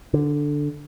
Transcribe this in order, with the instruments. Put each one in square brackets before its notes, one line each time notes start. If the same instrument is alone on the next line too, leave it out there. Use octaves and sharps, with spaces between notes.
[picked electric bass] D3